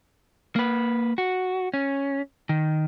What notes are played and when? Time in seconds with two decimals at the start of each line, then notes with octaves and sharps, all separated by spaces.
0.56 A#3 B4
1.18 F#4
1.74 C#4
2.49 D#3